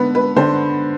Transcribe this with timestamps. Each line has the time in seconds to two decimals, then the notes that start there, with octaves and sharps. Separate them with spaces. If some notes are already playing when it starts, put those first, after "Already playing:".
Already playing: D3 B3 B4
0.15 B4
0.36 D3 C5